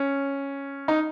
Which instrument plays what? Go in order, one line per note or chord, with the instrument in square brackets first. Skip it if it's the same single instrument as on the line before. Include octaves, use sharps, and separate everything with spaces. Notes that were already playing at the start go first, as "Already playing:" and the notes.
Already playing: [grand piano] C#4
D#4